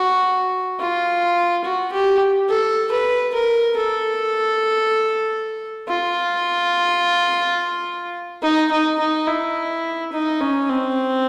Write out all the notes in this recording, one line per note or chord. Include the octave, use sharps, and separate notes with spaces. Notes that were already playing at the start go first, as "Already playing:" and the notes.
Already playing: F#4
F4
F#4
G4
A4
B4
A#4
A4
F4
D#4
D#4
D#4
E4
D#4
C#4
C4